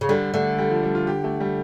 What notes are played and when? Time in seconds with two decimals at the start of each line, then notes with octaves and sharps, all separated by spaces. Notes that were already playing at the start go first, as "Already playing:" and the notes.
0.01 C#3
0.09 D3 G3
0.34 D3 A3
0.58 G3
0.70 F3
0.83 G3
0.95 F4
1.07 G4
1.24 A3
1.40 G3